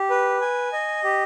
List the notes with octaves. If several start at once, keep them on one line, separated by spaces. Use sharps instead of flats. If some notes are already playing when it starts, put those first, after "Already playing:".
Already playing: G4
B4
G#5
D#5
G4